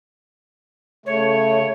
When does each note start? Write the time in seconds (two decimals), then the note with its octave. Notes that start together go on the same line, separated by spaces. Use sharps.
1.06 C#3 A3 C#5